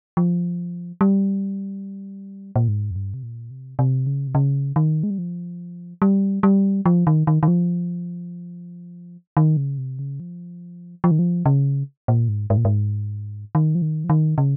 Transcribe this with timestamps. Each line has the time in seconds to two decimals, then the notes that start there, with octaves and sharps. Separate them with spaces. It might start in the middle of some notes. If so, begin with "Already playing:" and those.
0.17 F3
1.01 G3
2.56 A#2
2.68 G#2
2.91 F2
2.96 G2
3.14 C3
3.23 A#2
3.51 C3
3.79 C3
4.06 C#3
4.27 C3
4.35 C#3
4.76 D#3
5.03 G#3
5.10 G3
5.18 F3
6.02 G3
6.43 G3
6.86 F3
7.07 D#3
7.27 D#3
7.43 D#3
7.48 F3
9.37 D#3
9.57 C#3
9.78 C3
9.99 C#3
10.20 F3
11.04 F3
11.11 D#3
11.19 F3
11.46 C#3
12.08 A#2
12.28 G#2
12.50 G#2
12.57 A#2
12.65 G#2
13.55 D#3
13.75 F3
13.82 D#3
14.04 F3
14.10 D#3
14.38 C#3